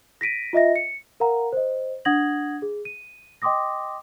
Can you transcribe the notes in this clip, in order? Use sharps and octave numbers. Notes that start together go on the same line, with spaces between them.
A#6 B6 D7 D#7
F4 D#5 E5 A#6
C#7
A#4 F5 F#5 A#5
C5 D#5
D4 F#5 D#6 G#6 A#6 F#7
G#4
D#7
D#5 G5 C6 D6 D#6 A#6